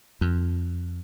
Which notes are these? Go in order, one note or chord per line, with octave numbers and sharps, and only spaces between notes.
F2